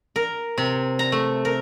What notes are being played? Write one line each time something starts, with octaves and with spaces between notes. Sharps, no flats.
A#4
C3
A#5
A3
A#4